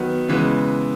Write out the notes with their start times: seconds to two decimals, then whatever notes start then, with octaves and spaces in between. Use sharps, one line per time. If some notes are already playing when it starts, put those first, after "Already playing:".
Already playing: D#3 F#3 B3
0.28 C#3 E3 G#3 B3